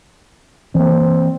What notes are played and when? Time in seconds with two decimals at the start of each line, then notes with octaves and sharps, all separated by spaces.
0.75 E3 A#3 C4